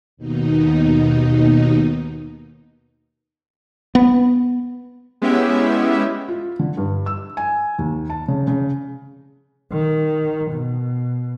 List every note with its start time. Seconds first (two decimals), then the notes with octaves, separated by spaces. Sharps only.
0.17 D#2 B2 D#4
3.95 B3
5.22 G#3 B3 C#4 E4 G4 E5
6.28 F4
6.59 D3
6.77 G2
7.06 E6
7.37 G#5
7.79 D#2
8.10 A5
8.28 C#3
8.47 C#3
9.71 D#3
10.51 B2